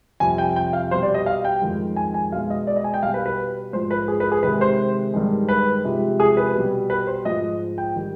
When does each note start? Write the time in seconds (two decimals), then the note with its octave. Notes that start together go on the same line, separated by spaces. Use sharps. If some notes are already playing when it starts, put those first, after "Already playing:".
0.20 F2 C3 G3 G#5
0.38 G5
0.56 G5
0.73 F5
0.91 B2 G3 C5
1.03 D5
1.14 D#5
1.26 F5
1.45 G5
1.62 F2 D#3 G#3
1.96 G#5
2.14 G#5
2.32 B2 G#3 F5
2.50 D#5
2.67 D5
2.76 D#5
2.84 G#5
2.94 G5
3.03 B2 G3 F5
3.14 B4
3.26 B4
3.73 G#2 F3 G#3 C5
3.91 B4
4.08 G#4
4.20 B4
4.32 G#4
4.43 C3 D#3 G#3 B4
4.61 C5
5.14 G2 D#3 G#3
5.49 B4
5.84 C3 F3 G#3
6.20 G#4
6.37 B4
6.55 B2 G3
6.90 B4
7.07 C5
7.25 G#2 F3 G#3 D#5
7.78 G5
7.96 D#3 G3